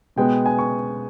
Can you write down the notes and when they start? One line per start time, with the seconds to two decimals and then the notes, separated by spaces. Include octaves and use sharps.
0.16 B2 G#3 B3 G5
0.46 G#5
0.59 C#6